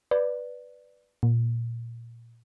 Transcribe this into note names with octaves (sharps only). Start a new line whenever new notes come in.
B4 D5
A#2